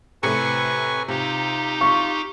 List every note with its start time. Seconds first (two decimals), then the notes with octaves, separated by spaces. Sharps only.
0.23 A2 C3 B4 G#5 C#6 C#7
1.08 C3 D#4 F4 G4
1.81 F4 C#6